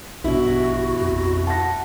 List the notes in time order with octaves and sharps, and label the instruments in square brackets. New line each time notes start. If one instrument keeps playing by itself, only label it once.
[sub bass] A#1 [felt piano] G2 B2 [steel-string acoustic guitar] E4 [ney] F#4
[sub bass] F2
[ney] F#5 [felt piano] A5 A#6